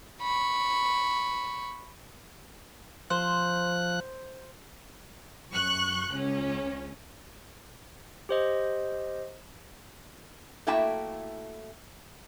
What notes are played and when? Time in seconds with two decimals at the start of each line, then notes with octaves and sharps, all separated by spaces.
0.21 B5 C#6
3.10 F3 C5 F#6
5.52 F#2 C#6 F#6
6.11 C#2 C#4
8.29 G4 C5 D#5
10.67 A3 A#3 E4 F#4 G5 A5